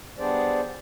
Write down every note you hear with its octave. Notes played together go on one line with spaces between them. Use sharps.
G3 B3 D4 G#4 C5 D5